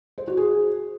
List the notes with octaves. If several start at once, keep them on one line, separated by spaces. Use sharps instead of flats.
C5
F#4
G#4